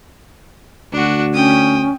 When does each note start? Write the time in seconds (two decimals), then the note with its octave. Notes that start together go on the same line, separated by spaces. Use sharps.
0.93 D2 D4 F#4
1.34 C#4 G5 D#6